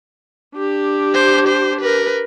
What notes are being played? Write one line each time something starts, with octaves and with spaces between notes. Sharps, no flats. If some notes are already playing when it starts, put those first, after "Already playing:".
D4 G4
C5
C5
A#4 B4